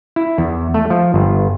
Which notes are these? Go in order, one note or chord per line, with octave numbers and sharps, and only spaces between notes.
E4
E2
A3
F3
G1